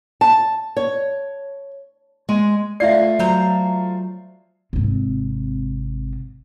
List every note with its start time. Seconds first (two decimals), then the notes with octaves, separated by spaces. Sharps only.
0.21 A5
0.77 C#5
2.29 G#3
2.80 A3 F4 D5 E5 C7
3.19 F#3 C5 A#5
4.73 G#1 C3